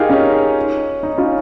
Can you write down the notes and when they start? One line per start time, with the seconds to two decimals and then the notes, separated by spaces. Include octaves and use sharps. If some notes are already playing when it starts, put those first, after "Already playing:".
Already playing: D#4 F4 G4 G#4 A#4
0.10 C#4
1.03 D#4
1.18 C#4 F4